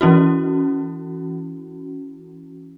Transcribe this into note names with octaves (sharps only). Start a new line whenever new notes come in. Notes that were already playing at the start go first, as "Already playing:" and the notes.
E3 C#4 E4 F#4